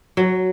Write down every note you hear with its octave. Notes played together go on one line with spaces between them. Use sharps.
F#3